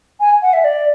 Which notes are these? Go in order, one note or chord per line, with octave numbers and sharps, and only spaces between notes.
G#5
F#5
E5
D5